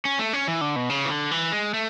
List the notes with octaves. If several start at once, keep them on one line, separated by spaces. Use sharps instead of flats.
C#4
A3
C#4
E3
D3
B2
C#3
E3
D3
E3
G#3
A3